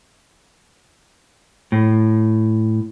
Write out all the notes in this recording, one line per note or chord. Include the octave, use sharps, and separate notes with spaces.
A2